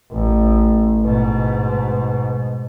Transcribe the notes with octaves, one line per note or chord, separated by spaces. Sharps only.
A1
G#2 B2